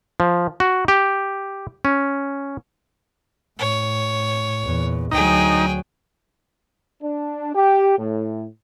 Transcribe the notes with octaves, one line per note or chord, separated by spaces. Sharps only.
F3
F#4
G4
C#4
A2 C#5
E2 A#2
D2 F#3 D#4 G#4 G5
D4
G4
A2